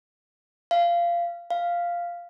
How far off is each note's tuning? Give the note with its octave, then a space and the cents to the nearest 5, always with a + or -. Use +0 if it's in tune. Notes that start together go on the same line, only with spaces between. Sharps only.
F5 -20
F5 -5